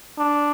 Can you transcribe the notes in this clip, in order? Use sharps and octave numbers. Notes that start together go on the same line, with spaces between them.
D4